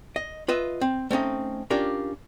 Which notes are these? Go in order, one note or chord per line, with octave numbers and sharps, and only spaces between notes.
D#5
F4 B4 D#5 E5
C4
A3 C4 C#4 D#4
C#4 D4 F4 G4 A#4